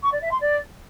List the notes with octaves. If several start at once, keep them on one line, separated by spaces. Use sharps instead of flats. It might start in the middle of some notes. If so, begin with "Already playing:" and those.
C#6
D5
E5
C6
D5